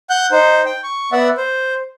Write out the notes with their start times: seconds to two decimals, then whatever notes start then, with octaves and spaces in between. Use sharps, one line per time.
0.10 F#5 F#6 G6
0.32 D#4 C5
0.66 G5
0.84 C#6
1.12 B3 D5 E5 F#5
1.37 C5